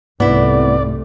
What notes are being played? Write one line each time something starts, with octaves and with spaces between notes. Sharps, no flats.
C2 G#2 C3 A3 B3 E4 D5